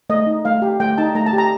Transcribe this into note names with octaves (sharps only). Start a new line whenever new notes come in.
A3 D#5
D#4
A3 F5
G4
A3 G5
D#4 A5
A3 A#5
A5
G4
A#5